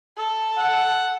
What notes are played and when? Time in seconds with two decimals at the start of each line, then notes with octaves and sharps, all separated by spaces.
0.17 A4
0.58 F#5